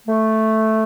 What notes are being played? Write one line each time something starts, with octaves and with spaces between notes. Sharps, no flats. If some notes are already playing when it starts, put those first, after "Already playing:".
A3